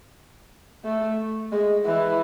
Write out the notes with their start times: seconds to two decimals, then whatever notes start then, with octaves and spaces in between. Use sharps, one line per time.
0.85 A3
1.52 G#3
1.86 E3